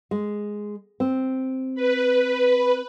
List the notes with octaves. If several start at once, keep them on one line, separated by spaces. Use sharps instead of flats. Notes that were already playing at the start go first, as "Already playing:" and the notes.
G#3
C4
B4